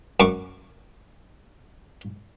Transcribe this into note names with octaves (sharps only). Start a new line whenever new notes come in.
F#2 C#6 D6